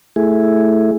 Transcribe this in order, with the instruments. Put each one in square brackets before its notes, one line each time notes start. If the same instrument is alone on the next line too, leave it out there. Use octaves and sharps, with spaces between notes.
[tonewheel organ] A3 E4 G#4